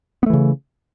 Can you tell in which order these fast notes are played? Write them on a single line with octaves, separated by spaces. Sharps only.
B3 A3 E3 C#3